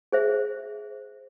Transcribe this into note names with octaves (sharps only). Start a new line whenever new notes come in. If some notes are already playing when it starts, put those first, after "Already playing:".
G#4 C5 E5